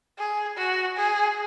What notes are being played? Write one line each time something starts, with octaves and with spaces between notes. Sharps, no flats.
G#4
F#4
G#4